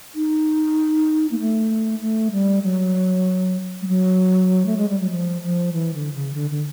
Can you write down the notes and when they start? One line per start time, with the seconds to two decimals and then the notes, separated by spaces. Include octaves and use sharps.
0.15 D#4
1.31 A#3
1.40 A3
2.01 A3
2.31 G3
2.63 F#3
3.82 G3
3.87 F#3
4.66 A3
4.77 G#3
4.89 G3
5.00 F#3
5.11 F3
5.42 F3
5.73 E3
5.94 D3
6.13 C#3
6.34 D3
6.50 D3